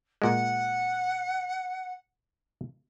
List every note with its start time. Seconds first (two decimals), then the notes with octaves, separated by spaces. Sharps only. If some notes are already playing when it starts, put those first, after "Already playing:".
0.22 A#2 G#3 F#5